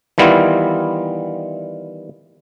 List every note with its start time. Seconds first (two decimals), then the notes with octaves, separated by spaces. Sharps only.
0.18 D#3 E3 G3 B3 E4 F4